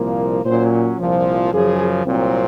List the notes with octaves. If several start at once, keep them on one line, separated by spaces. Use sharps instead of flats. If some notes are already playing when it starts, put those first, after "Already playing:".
Already playing: C2 A#2 F3 A#3
A#2 F#3 C#4 C5
C2 A#2 F3
F#2 C#3 F3 G#4
C2 A#2 F#3 C4